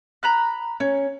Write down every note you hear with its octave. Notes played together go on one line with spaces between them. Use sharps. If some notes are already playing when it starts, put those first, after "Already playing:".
A#5 B5 F#6
C#4 C#5